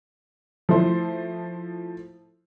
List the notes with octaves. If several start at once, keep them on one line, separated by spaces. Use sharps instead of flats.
F3 A3 E4 C5